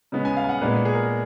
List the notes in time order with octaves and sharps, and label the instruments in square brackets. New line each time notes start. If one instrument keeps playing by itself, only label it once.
[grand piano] C#3 G#3 B3
G#5
F5
G#5
F#5
A#2 G#3 B3 B4
G#4
A#4